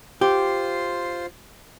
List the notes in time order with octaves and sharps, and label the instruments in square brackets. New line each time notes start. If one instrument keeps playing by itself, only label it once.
[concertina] F4 C5 [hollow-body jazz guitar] G4